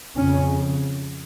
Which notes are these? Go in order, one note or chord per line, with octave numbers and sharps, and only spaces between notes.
F2 C#3 C#4